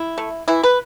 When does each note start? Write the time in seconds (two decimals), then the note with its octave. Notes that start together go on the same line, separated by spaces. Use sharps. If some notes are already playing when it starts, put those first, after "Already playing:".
Already playing: E4
0.18 A3
0.48 E3 E4
0.63 B4